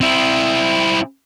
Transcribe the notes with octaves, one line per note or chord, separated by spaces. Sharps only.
C4 E4